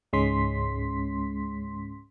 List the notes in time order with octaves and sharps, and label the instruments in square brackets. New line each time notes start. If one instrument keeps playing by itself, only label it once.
[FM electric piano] C#2 G#2 G#3 C#4 C6 B6